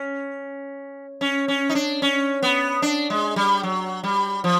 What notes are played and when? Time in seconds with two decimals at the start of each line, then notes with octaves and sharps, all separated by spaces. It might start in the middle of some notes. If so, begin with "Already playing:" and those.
Already playing: C#4
1.21 C#4
1.48 C#4
1.69 D#4
1.75 D4
2.02 C#4
2.43 B3
2.82 D4
3.10 G#3
3.36 G3
3.63 F#3
4.04 G3
4.44 F3